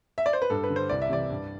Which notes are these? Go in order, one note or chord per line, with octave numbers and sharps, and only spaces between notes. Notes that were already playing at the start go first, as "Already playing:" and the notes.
E5
D5
C5
B4
G2 A4
B4
D3
C5
C2 D5
E5
C3 E3 D5
G2